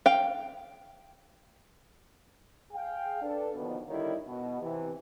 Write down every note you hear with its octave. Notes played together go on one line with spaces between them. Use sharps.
F5 G5
G#4 F5 G5
D4 A4 B4
D#2 B2 D3 D#3 F3 B3
D3 D#3 G3 D#4 E4 C#5
B2
C3 E3